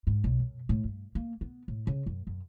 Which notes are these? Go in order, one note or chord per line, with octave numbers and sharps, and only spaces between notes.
G#2
B1
F#2
A2
G2
A#3
B3
A2
C#3
F#2
F#2